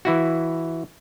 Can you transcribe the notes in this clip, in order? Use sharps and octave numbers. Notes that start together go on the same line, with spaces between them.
E3 E4 F#4